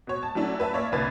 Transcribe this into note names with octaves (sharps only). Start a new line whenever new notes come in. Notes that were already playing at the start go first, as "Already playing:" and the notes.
B2 C#5
A5
F#3 A3 C#4 D4 E4
B4 E5 A5
A#3 C#5 D5 E5
G1 C2 B4 G#6 A6